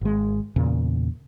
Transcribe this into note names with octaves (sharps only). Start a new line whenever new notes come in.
G#1 G#3
E2 A#2 C#3